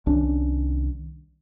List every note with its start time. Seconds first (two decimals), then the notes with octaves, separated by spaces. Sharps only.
0.06 C2 D#3 C#4 D4